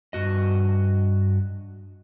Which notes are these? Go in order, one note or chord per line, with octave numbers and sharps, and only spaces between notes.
G2 F#4 D#5